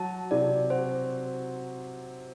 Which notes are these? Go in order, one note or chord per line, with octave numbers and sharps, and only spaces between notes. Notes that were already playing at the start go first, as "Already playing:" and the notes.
Already playing: F#3 A5
C3 D5
F#4 C5